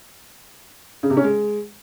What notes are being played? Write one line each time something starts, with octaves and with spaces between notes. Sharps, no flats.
C#3
C3
C#4
G#3